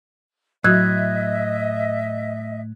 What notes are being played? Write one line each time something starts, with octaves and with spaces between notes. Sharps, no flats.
A2 F#3 F#4 D#5 E5 F#6 G#6